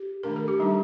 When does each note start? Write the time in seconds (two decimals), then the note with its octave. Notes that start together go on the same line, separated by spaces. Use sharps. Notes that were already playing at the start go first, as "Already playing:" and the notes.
Already playing: G4
0.23 D#3 A3 D4 A#4
0.36 A4
0.48 G4
0.60 G3 D4 D#4